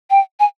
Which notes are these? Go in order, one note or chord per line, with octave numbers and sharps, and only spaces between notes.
G5
G#5